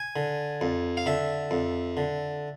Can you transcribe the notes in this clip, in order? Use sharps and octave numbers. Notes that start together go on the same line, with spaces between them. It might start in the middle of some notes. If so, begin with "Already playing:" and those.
Already playing: G#5
D3
F2
F5
D3 E5
F2
D3